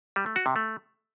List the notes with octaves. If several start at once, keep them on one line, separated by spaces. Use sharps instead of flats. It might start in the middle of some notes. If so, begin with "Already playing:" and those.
G3
A3
F#4
C3
A3